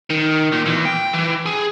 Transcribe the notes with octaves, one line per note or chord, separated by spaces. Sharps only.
D#3
A#2
E2
G5
E3
G#4